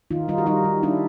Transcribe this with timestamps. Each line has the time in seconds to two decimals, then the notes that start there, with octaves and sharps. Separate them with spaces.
0.11 D#3 D#4 F4
0.28 G3 D#4 F4
0.38 F#4
0.46 G3 D#4 F4
0.64 G3
0.83 G3 D4 E4